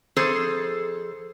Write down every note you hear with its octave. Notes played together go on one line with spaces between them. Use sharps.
F2 G#4 A4 C5